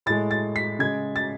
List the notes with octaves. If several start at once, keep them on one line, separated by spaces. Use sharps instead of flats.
A2 G#3 A6
A6
B6
C#3 G#3 G#6
A6